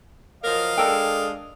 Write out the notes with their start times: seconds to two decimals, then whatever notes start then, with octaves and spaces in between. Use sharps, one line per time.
0.43 F3 F#3 A#4 D#5 F5
0.78 G#3 D4 A4 A#4 G5